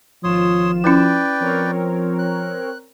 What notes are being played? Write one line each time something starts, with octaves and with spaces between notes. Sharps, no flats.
G#1 F3 F4 C#5 C6 D#6 E7
C#4 E4 B4 D5 G5
F3 C4 A#4 C#5
F#6